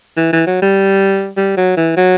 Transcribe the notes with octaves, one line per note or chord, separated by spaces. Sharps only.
E3
E3
F#3
G3
G3
F#3
E3
F#3